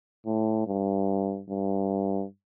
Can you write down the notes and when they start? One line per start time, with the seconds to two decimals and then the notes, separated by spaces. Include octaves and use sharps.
0.26 A2
0.67 G2
1.50 G2